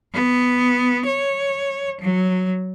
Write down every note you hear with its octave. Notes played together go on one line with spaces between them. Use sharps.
B3
C#5
F#3